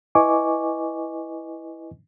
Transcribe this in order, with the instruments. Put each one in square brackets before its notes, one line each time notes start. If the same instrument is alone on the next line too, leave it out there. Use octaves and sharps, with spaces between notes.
[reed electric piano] E4 B4 D#5 G#5 C#6 D6